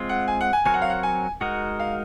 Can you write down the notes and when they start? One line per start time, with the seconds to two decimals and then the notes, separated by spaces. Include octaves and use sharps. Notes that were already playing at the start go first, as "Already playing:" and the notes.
Already playing: G#3 C4 F4
0.09 F#5
0.28 G#5
0.41 F#5
0.53 G#5
0.65 F#3 C4 F#4 A#4 C#5 G#5
0.74 F#5
0.82 F5
0.90 F#5
1.03 G#5
1.41 G#3 D#4 F#4 A#4 F#5
1.80 F5